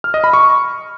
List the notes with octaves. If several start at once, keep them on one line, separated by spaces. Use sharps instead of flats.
F6
D#5
B5
C#6